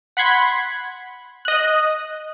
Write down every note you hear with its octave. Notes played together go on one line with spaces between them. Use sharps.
F#5 B5 C6 G#6 B6
D#5 F#6